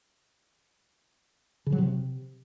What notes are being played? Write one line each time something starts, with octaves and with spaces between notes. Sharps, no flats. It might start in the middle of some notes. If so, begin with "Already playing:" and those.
C#3
F#3
C3